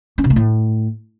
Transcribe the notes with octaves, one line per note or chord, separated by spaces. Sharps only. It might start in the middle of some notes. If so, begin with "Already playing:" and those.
C#4
C3
A3
A2